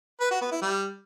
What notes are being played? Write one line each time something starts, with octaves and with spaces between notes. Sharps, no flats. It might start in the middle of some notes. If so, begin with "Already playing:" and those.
B4
F#4
B3
E4
G3